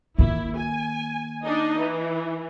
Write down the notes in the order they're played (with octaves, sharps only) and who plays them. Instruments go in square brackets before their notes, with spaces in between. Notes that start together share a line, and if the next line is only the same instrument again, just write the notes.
[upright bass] D#3 A#3 [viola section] E4
[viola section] G#5
D4 D#4 D#5
E3